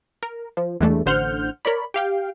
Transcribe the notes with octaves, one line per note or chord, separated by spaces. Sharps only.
A#4
F3
E2 G2 E3 G#3 A3 D4
A1 D3 C5 F#5 F6 G6
A#4 C#5 D5 B5
G4 F5 G5